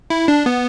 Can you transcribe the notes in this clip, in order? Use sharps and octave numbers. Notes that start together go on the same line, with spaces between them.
E4
D4
B3